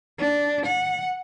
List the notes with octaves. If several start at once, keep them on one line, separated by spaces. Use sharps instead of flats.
D4
F#5